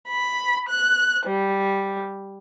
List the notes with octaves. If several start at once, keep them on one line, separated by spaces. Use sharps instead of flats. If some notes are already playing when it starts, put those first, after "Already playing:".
B5
F#6
G3